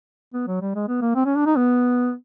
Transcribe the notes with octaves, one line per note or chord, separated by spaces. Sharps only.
B3
F#3
G3
G#3
B3
A#3
C4
C#4
D4
D#4
B3